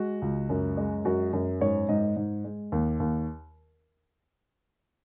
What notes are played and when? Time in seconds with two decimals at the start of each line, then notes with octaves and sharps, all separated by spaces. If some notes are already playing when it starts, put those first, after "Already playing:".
Already playing: G#3 F#4
0.22 C#2
0.49 F#2
0.77 G#3
1.05 F#2 F#4
1.33 F#2
1.61 G#2 C#5
1.89 G#2 D#5
2.16 G#2
2.44 G#3
2.72 D#2
3.00 D#2